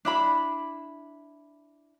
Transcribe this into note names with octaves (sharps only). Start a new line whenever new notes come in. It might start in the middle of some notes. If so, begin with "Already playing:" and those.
D4 E4 B5